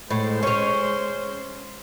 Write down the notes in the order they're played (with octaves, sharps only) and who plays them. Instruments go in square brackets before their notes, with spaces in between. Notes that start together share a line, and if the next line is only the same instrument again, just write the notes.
[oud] A2 [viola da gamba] G#3 C5
[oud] C#4 C#5